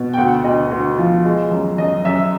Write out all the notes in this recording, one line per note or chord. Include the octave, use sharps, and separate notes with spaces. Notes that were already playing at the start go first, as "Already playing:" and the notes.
Already playing: B2
G5
D2 F#5
D2 D#5
D2
F3
G#3
F#2
F#2 D#5
F#2 E5